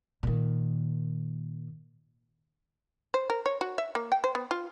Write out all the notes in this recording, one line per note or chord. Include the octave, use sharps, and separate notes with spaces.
A#2 D#3
C5
A#4
C#5
F#4
E5
A#3
G5
C5
B3
F4